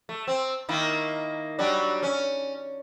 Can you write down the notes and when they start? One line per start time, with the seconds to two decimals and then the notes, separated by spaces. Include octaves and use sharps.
0.09 A3
0.28 C4
0.69 D#3 A#3 E4
1.59 F#3 G3 D4
2.03 C#4